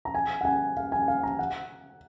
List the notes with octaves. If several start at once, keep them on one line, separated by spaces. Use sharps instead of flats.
A#5
G#5
F#5
G#5
F5
G#5
F5
A#5
F#5